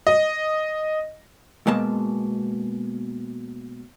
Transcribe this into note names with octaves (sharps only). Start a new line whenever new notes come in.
D#5
B2 G#3 A#3 A5